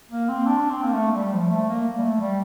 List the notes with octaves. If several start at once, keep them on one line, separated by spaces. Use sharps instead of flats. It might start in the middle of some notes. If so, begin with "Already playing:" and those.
A#3
C4
D4
C4
A#3
A3
A3
G3
F3
A3
A#3
G3
A3
G3